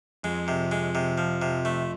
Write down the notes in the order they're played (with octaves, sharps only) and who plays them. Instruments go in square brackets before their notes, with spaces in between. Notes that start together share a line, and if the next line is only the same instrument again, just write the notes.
[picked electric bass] F2 [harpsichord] G#3
[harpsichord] C3
G#3
C3
F3
C3
A3